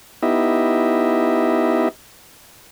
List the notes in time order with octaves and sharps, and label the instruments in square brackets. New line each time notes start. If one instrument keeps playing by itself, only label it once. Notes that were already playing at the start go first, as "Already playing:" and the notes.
[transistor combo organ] B3 D#4 E4 G4 D#5 E5